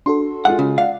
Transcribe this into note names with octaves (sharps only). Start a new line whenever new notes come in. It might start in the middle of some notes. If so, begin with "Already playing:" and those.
D4 F#4 A4 C6
G#3 F4 F#5
C#3 C#4
D5 F5 F#5